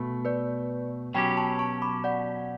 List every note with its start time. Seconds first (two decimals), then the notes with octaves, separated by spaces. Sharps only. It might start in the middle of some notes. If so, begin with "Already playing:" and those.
Already playing: B2 A3
0.25 B4 D5
1.14 B2 F#3 C#4 G4 G5 B5
1.37 A5 C#6
1.59 A5 C#6
1.82 B5 D6
2.04 D5 F#5